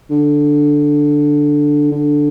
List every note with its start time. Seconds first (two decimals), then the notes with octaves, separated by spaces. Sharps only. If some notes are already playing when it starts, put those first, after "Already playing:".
0.10 D3
1.92 D3